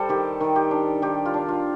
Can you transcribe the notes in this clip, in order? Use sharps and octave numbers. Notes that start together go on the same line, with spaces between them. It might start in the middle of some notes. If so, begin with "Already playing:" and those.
Already playing: G3 A4 C5
D#3 G4
D#3
G4
D4
D#3 G4
F4
D4
F4